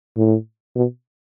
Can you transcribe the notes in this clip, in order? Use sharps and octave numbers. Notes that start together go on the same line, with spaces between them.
A2
B2